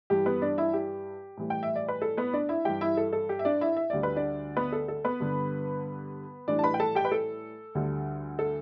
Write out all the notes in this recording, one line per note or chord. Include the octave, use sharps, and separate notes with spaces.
G2 E3 G3 G4
B3 B4
D4 D5
E4 E5
G4
A2 E3 G3
G5
E5
D5
B4
A4
B3 B4
D4 D5
E4 E5
G2 E3 G3 G4 G5
E4 E5
A4
A4
G4
E5
D4 D5
E4 E5
E5
D2 D3 G3 D5
B4
D4 D5
B3 B4
A4
A4
B3 B4
G2 D3 G3
A2 E3 G3 D4 D5
A5
B4 B5
G5
A4 A5
G4 G5
B4
A4
D2 D3 G3
A4